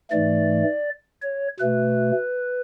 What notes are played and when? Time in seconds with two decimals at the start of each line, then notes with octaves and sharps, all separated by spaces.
0.11 G#2 E3 A3 D5
1.22 C#5
1.60 B2 A3 B4